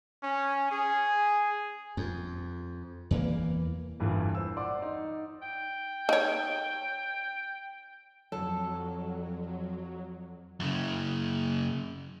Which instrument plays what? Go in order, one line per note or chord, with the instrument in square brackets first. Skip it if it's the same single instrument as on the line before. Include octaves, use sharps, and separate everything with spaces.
[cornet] C#4
G#4
[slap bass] F2
E2 E3 A#3
[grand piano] G1 E2 G2 A#2 E3
C5 E6
D5 F#5 C6 D6
D#4
[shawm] G5
[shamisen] D#4 C#5
[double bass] F2 [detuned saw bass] F#3 [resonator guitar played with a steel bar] A4
[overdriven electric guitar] F#2 C#3